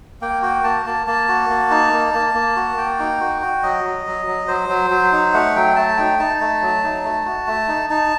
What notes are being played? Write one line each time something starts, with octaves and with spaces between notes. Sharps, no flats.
A#3 G5
F#4 G5
A#3 A5
A#3 A5
A#3 A5
F#4
A#3
D#4
A#3
A#3
A#3
F#4
A#3 G5
D#4
F#4
F#4
F#3 D#5
F#3
F#3
F#3
F#3 C5
F#3
F#3
D#4
A3 F#5
F#3 G5
A3 A5
D#4 G5
D#4 A5
A3
F#3
D#4
A3
F#4
A3
D#4
D#4 A5